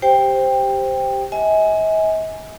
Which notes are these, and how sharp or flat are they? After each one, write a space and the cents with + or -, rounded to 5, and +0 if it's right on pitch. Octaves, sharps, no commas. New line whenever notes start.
G4 +0 C5 +0 G5 +15
D#5 +45 G#5 +5